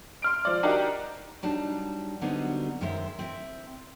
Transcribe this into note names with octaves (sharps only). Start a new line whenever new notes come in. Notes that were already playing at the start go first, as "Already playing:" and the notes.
C6 F6 D7
F3 D5
D4 D#4 F#4 G4 A#4 D5
F#3 G3 D4 D#4 A5
D3 F#3 G3 B3 C4 D#4
F#2 D#3 G#3 C5 E5
C4 E4 E5